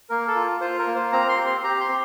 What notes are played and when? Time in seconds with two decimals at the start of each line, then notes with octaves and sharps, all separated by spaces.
0.10 A#3 A#4
0.27 A4
0.36 F4
0.61 F4 C5
0.79 A#4
0.87 A#3
0.95 C5
1.12 C4 A#5
1.29 C6
1.38 G4
1.47 C6
1.64 G4 A#5
1.80 C6
1.88 C4